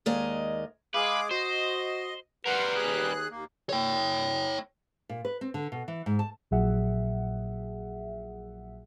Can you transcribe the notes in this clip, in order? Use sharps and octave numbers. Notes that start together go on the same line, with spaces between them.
D#2 G#3 A#4 D5 D#5
G#3 G#4 B4 F5 D6
F#4 C5 D#5
G3 A#4 B4 F#5 C6
D#2 G#4 F#6
D#2 A#3
C#5 G5
A#2
B4
C4
D3
B2
E3
G#2
A5
A#1 A#2 F#3 G#4 E5 F#5